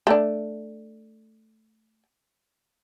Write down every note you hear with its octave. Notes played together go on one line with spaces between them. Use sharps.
A3 D4